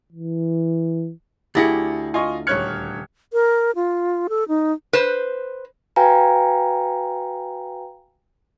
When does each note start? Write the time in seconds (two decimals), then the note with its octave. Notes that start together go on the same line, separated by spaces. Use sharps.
0.13 E3
1.55 D2 E4 G4 G#4 A6 A#6 C#7
2.14 F4 D#5 G#5 C#6
2.47 D#1 C#5 F6 F#6 G#6 C#7
3.33 A#4
3.75 F4
4.29 A4
4.48 D#4
4.93 B4 C5
5.96 F#4 B4 F5 G5 G#5 A#5